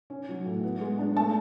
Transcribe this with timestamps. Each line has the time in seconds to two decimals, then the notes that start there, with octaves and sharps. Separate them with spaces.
0.10 C#4
0.29 F#3
0.46 A2
0.64 B3
0.81 G#3
0.99 D4
1.17 A3 A5